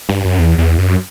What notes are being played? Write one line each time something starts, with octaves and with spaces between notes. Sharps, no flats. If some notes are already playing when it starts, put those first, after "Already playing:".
G2
F#2
E2
E2
F#2